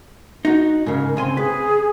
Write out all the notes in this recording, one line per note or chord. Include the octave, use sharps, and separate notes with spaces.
D#4 F#4
G#2 C#3 A#4
C#3 C4 G#5 C6
G#4 B4